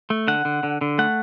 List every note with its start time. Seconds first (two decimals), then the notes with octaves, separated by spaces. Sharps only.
0.10 A3
0.28 D3 F#5
0.45 D3
0.63 D3
0.81 D3
0.98 A3 F#5